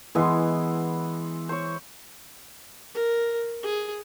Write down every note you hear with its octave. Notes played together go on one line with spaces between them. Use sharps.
E3 G#3 B3 E4 C6
C5 C#5
A#4
G#4